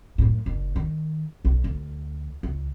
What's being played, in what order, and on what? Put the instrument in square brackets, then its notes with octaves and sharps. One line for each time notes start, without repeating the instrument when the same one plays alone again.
[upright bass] F#2 A2
F#1
D#3
B1
D2
C#2